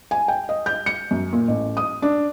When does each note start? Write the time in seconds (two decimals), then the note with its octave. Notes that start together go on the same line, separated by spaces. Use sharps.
0.11 G#5
0.28 G5
0.49 D#5
0.66 G6
0.86 C#7
1.11 F#2
1.33 A#2
1.48 A1
1.77 D#6
2.02 D4